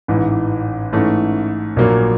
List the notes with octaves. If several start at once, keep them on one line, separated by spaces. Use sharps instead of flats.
A1 G#2 E3
G#2 E3 A3 C#4
A#1 A#2 F#3 A#3